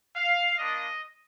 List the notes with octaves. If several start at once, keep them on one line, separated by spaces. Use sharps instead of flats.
F5
A#3 D4 F4 D#5